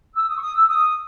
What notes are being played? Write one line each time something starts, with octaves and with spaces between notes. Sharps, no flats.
E6
D#6
C#6
D#6
E6
D#6